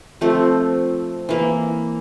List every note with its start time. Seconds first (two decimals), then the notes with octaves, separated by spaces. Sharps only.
0.21 F3 A3 C4
1.29 E3 A#3